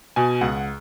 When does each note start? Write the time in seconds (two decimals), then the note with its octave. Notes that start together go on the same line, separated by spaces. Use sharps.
0.16 B2 G#5
0.41 C#2 F#5